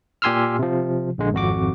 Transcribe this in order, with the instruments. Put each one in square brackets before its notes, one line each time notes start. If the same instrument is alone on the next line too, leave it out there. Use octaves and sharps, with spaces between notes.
[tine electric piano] A#2 G4 G#5 C6 E6 F6
C3 F3
A#1 D3 G#3
G#1 F2 F#4 D6